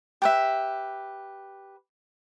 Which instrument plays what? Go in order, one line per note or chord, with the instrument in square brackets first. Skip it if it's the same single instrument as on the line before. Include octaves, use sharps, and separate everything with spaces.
[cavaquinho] G4 B4 E5